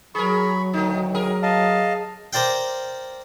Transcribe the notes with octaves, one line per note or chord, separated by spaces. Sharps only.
F#3 G#4 A#4 B5 C#6
D2 D#3 A3 D#4
G#4 A#4
D#5 F5 A5
A#4 C5 D5 F5 G5